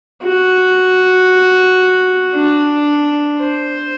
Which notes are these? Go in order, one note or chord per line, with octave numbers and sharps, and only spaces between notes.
F#4
D4
C5